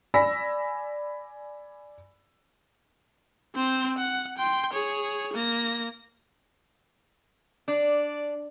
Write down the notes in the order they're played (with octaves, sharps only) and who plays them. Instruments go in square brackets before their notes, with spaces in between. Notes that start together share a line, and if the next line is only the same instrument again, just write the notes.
[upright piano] D5 G#5 B5 E6 A#6 B6
[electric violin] C4 C5
F#5
G5 C6
G#4 C#5
A#3 A#6
[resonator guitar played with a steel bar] D4 [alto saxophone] D5